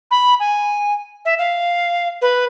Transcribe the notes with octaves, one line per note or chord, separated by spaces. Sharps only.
B5
G#5
E5
F5
B4